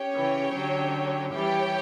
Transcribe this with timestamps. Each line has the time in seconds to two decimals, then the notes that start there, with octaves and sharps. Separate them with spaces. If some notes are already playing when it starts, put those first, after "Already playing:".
Already playing: C#4 G4 C#5 G5
0.16 C#3 E3
0.55 D3 F#3
1.32 E3 G3 G4 C#5 G5